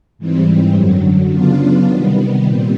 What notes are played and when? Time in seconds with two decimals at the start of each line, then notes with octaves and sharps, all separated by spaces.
0.18 G#2 E3 G3 C4
0.75 F#2 D3 F#3
1.32 C#3 F#3 B3 D4 F4
1.89 C3 D#3 G3 B3
2.46 A#2 G3 C4